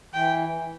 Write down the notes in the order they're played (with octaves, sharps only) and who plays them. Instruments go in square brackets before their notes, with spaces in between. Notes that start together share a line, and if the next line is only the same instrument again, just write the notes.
[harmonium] E3 [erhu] G5